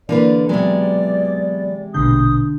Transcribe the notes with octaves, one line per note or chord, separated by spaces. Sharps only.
D3 E3 A#3 B4 D5
C3 F#3 G#3 B3 D5
A#1 B2 D3 D#6 G6